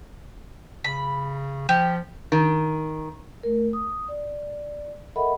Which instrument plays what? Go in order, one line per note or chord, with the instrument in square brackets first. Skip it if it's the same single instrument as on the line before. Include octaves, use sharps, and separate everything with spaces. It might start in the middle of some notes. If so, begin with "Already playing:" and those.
[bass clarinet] C#3 [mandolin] B5
[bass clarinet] F3 [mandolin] G4
[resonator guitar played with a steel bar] D#3
[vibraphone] A3 A#4
D#6
D5
A4 A#4 D#5 E5 F#5 B5